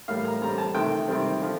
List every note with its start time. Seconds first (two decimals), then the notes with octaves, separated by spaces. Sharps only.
0.08 A2 G3 A#3 F5
0.25 A#5
0.41 D3 G3 C4 A#5
0.58 A5
0.75 C3 D#3 A3 G5
1.08 C3 D#3 G3 C4
1.41 D3 F3